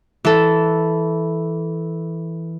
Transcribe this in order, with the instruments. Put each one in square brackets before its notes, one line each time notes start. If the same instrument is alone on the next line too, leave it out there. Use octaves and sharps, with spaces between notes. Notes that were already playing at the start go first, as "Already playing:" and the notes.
[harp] E3 A4